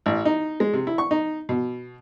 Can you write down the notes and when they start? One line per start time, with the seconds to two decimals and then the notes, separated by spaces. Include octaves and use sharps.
0.06 A1
0.25 D#4
0.60 G#3
0.73 C3
0.87 E4
0.98 C#6
1.11 D#4
1.49 B2